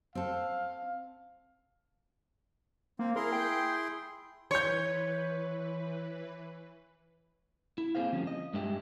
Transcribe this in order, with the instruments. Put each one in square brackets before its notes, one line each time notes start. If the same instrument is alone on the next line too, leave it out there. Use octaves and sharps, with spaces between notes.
[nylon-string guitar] C4 A4 [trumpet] F5
[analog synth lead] A#3 [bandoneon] C4
[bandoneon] E4 G#4 C6 [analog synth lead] A#4
[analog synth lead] G5
[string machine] E3 B4 [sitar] C#5 [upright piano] C6 G6
[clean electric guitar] E4
A#3 C4 D#4 G#4 C5 F5
D2 F3 G3 C#4
D#5
G2 G#3 D4 G4 D#5 E5